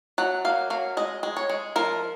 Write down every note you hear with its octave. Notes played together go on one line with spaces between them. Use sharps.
F#3 F#5
A#3 F5
F#3 F5
G#3 D#5
G#3
C#5
G#3
F3 A#4